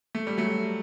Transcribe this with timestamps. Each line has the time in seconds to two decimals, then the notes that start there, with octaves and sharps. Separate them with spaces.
0.15 A3
0.27 G3
0.38 F#3 A3